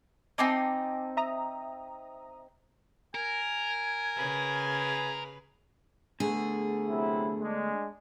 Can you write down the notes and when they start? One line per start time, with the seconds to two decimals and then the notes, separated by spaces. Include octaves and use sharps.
0.38 C4 D#4 D#5 G#5 A5 D6
1.17 E5 A#5 D#6
3.15 A#4 G#5
4.16 C#3 G#4 B4
6.20 D3 A3 B3 G#4
6.88 C3 F#3 E4
7.42 G#3 D4